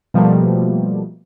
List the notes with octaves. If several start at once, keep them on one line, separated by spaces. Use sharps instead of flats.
B2 F3 G3 A3 A#3